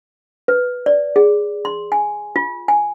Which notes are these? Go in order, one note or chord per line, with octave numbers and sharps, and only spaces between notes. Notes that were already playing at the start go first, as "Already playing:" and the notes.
B4
D5
G#4
C6
G#5
F4
G#5